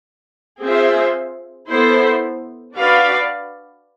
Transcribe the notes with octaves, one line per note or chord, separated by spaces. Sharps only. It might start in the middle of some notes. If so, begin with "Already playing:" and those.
C4 F4 G#4 C5 E5
B3 E4 A4 C5
D4 F#4 B4 D5 F5